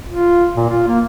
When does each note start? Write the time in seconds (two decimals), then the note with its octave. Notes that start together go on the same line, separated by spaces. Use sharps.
0.09 F4
0.57 A#2
0.69 F4
0.88 A#3